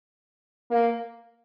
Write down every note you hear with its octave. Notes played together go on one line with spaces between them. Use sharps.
A#3